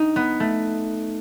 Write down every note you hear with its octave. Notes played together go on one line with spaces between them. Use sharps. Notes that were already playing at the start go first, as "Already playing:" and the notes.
Already playing: D#4
B3
A3